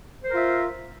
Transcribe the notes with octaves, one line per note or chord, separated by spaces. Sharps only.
F4 A#4 C5 E5